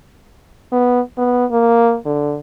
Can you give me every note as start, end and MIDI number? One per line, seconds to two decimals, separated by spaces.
0.72 1.01 59
1.18 1.45 59
1.51 1.97 58
2.06 2.38 50